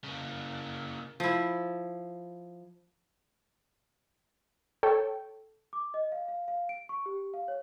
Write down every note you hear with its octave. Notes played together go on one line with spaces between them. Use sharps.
C#3 A#3
F3 E4
A4 C#5 G5
D6
D#5
F5
F5
F5
D7
C#6
G4
F5
C#5